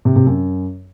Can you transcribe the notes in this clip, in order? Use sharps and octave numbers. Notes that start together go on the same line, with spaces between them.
C3
C3
F#2